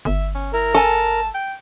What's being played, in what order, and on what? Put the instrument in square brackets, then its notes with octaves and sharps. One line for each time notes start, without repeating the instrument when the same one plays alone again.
[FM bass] G1 [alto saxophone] E5
[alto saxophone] C#4
[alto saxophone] E4 [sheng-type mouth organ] A#4
[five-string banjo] A4 G#5 [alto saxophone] A5
[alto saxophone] G5